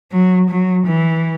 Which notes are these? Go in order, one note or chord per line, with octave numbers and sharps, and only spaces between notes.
F#3
F#3
E3